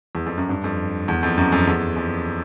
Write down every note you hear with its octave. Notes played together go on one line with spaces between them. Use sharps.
E2
F2
F#2
G2
F2
E2
F2
F#2
F2
E2
F2